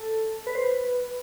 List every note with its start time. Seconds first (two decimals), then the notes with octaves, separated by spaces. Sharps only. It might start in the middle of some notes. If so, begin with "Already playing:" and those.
Already playing: A4
0.47 B4
0.55 C5
0.64 B4